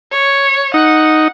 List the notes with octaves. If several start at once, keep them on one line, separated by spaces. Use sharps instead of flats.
C#5
D#4 F#5